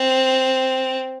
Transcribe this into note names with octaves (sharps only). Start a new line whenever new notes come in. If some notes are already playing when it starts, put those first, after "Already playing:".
Already playing: C4